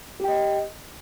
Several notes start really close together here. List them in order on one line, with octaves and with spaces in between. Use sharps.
G4 G5 D#5